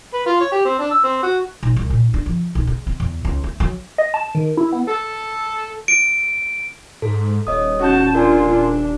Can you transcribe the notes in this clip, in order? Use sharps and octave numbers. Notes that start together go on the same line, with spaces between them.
B4
F4
C#5
G4
C4
D4
E6
C4
F#4
B1
C2
A#2
D4
F3
B1
G#3
C4
E2
C#2
A3
F#3
D#5
A5
D#3
E4
B3
A4
D7
G#2 A4
D#1 C#5 D#5 D#6
C#4 F#4 A5 G6
D4 F4 A#4 D5 G#5
D4